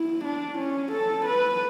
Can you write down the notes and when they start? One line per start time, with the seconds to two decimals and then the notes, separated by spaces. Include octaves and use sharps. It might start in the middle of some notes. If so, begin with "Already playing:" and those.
Already playing: E4
0.25 D4
0.58 C#4
0.92 A4
1.26 B4